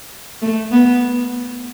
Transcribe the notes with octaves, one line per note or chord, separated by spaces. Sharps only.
A3
B3